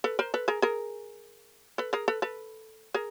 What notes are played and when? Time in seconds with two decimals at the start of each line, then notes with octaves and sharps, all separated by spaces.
0.04 A4 B4
0.19 A#4 C5
0.34 A4 B4
0.48 G#4 A#4
0.62 G#4 A#4
1.78 A4 B4
1.93 G#4 A#4
2.08 A4 B4
2.22 A4 B4
2.94 G#4 A#4